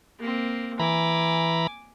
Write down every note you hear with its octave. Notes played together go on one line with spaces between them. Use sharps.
A#3 C4
E3 G#5 A#5 B5 D6